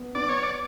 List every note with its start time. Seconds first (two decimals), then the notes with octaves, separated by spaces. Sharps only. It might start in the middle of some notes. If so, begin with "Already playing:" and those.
Already playing: B3
0.15 B3 D5
0.29 C#5
0.43 D5